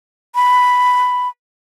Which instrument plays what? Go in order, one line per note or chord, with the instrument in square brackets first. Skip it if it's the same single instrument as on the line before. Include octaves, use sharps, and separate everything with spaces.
[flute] B5